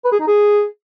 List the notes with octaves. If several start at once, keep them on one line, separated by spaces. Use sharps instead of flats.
B4
G#4
D#4
G#4